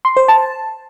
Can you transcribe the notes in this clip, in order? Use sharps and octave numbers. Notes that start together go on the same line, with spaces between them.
C6
C5
A5